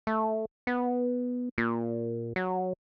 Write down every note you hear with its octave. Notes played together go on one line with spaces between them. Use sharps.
A3
B3
A#2
F#3